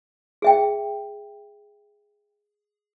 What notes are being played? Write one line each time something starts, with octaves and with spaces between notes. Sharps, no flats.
G#4 E5 G5